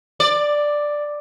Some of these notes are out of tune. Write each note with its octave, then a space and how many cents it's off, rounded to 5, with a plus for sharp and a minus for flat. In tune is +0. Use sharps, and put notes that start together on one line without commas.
D5 +5